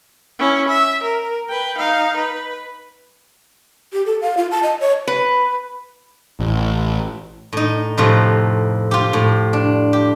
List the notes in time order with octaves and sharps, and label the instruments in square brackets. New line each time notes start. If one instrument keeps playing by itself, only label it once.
[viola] C#4 E4
E5
A#4
B4 G5
D#4 F5
B4
[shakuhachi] G4
A4
F5
F4
A5
D#5
C#5
[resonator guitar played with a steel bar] B4
[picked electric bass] A1
[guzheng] A2 D#4
F2 A2 C3 F4
F4 G4
A2
D4
G4